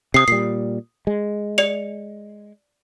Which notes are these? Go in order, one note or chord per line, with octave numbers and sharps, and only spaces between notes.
C3 D#6 C7
A#2 G3 C7
G#3
D5 C#7 F7